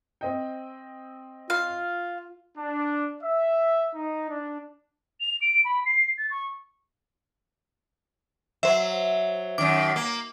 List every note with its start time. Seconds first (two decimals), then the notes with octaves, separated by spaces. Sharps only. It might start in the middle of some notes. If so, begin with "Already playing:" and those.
0.21 C4 D#5 G5
1.50 F4 F5
2.56 D4
3.22 E5
3.94 D#4
4.28 D4
5.20 F7
5.41 D7
5.65 B5
5.86 C7
6.18 A6
6.31 C#6
8.63 F#3 C5 E5
9.58 F#2 D#3 D6
9.96 A#3